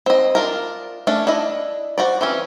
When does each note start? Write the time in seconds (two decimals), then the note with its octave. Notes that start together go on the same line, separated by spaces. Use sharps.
0.06 C4 D#5
0.35 D4 F4 A#4
1.07 A3 C#4 D4
1.27 D4 E4 D#5
1.98 F#4 C5 D5
2.21 E3 C4 C#4